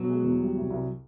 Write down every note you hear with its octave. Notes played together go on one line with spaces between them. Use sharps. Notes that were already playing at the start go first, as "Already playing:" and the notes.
Already playing: B2 F#3
G#3
E2
G3
C2
C2